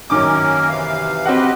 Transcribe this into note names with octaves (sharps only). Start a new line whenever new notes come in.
F#2 D#3 A#3 C#4 A#4 D6
C3 E3 F5
C4 F#4 G4 B4 D#5 F#5